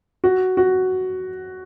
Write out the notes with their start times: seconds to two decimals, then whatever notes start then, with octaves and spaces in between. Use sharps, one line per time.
0.24 F#4
0.57 F#4